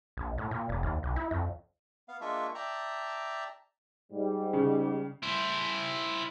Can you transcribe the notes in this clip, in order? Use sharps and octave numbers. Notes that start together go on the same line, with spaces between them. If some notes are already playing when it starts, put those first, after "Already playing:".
A#1
A2
A#2
F1
D#2
B1
E4
F2
B3 F5
G#3 A#3 D4 F4 E5 C#6
D5 E5 G5 A5 A#5
G#2 G3
C#3
E4 C5